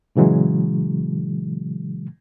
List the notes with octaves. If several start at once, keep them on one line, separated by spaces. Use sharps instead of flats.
A#2 C#3 E3 F#3 G#3